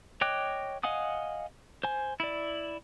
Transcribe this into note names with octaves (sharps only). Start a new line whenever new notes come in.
C#5 D#5 G5 D6 F#6
D#5 F5 F#5 G#5 D#6
C5 G#5
E4 D5